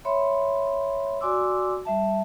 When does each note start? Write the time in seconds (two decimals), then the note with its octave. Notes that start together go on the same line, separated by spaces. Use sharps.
0.05 C#5 E5 B5 C6
1.21 F#4 D5 G#5 C6 D6 E6
1.85 G3 E5 A5